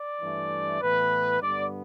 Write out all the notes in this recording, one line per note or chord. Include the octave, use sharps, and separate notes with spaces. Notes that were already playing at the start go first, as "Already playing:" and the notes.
Already playing: D5
G2 E3 A3
A2 E3 B3 B4
G2 D3 B3 D5